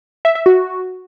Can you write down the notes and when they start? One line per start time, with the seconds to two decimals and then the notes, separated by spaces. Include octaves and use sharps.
0.25 E5
0.35 E5
0.46 F#4